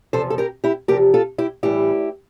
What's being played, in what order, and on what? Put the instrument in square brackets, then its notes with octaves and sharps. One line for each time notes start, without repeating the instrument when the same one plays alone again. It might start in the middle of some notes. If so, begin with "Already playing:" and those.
[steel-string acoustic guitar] E2 C3 F3 A4 C5
A4
G4 A#4
E4 G4
E2 C3 F3 G4 A#4
F4 A4
E4 G4
A2 E3 G3 E4 G4